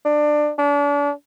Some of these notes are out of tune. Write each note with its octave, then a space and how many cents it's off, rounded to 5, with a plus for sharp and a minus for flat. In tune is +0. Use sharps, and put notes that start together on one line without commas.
D4 +20
D4 -35